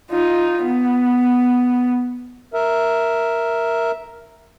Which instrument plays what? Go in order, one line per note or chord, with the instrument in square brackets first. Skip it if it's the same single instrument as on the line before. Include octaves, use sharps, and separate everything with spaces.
[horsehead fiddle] D#4 F4
B3
[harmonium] A#4 E5